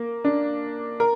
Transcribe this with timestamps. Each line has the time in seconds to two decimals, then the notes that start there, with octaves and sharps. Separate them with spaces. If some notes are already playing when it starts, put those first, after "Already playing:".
Already playing: A#3
0.24 D4
1.00 A#4